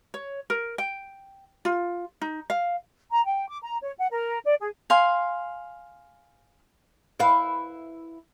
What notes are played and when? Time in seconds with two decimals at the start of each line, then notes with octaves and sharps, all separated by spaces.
0.14 C#5
0.50 A#4
0.78 G5
1.65 F4
2.21 D#4
2.50 F5
3.11 A#5
3.25 G5
3.47 D6
3.62 A#5
3.82 C#5
3.98 F#5
4.11 A#4
4.45 D5
4.60 G#4
4.90 F5 G#5 C6
7.19 E4 B4 F5